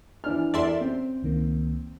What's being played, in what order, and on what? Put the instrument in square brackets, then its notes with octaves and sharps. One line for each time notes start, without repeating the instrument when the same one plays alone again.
[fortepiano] E3 D4 F6
[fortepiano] E2 [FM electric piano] A4 A#4 [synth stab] D5 E5 C6
[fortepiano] C4 [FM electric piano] C#4
[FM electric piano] C#2 D#3 A#3